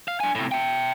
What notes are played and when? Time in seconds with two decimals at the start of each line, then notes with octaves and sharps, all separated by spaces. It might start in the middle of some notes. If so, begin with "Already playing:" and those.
0.08 F5
0.20 D4 G#5
0.35 A2 C3
0.51 E5 G5